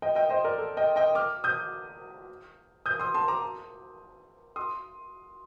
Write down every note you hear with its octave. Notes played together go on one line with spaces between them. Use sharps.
D#5 G5
D#5 G5
C5 D#5
A#4 D5
A4
D#5 G5
D#5 G5
D6 F6
D#6 G6
D#6 G6
C6 D#6
A5 C6
A#5 D6
C6 D#6